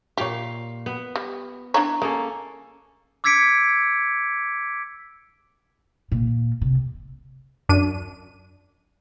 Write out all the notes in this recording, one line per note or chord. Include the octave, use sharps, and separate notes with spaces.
A#2 G4 C#5 F5
B3
G3
D4 E4 C#5 A#5
G#3 A#3 C#4 A4
D6 E6 G#6 B6 C#7 D7
A#2
C3
F#2 D4 D#7